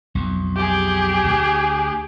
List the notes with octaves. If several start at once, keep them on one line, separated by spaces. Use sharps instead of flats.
B1 F2
G4 G#4
D2